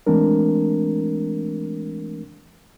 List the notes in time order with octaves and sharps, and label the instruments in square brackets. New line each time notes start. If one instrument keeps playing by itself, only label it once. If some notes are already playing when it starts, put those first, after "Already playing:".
[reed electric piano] E3 G#3 A3 C4 D4 A#4